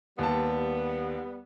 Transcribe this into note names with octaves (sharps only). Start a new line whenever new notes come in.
D#2 G3 B3 A5